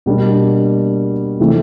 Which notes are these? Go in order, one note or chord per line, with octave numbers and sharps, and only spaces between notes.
B2 G3 A#3 D4
C3 E3 A3 C4